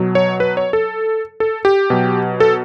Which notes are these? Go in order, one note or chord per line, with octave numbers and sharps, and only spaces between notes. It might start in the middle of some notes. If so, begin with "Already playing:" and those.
Already playing: B2 F#3
C#5
B4
C#5
A4
A4
G4
B2 F#3
A4